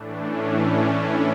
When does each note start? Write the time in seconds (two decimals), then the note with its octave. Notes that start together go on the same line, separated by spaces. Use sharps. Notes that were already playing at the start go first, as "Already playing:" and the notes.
Already playing: A2 E3 A3 D4
0.19 C#4
0.81 E4